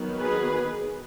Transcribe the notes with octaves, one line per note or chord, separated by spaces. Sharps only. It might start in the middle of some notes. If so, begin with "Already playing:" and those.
Already playing: D#3 F#3 B3
G#4 B4